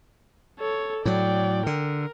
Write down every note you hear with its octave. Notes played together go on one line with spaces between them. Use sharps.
A4 C#5
A2 F#3 D5 G5
D3 A#4